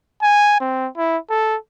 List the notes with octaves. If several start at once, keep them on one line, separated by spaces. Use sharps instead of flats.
G#5
C4
E4
A4